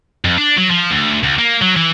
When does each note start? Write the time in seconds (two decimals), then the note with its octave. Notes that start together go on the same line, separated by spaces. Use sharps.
0.25 F2
0.38 D4
0.58 F#3
0.71 F3
0.91 D2
1.23 C#2
1.39 A#3
1.62 F#3
1.76 E3